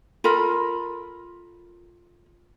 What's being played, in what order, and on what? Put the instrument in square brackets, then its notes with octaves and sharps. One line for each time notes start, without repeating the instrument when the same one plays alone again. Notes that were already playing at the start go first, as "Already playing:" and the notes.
[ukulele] F4 A4 A#4 B5